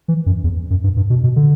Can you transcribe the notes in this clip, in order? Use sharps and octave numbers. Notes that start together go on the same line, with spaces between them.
E3
F#2
E2
F#2
G2
G2
B2
B2
D3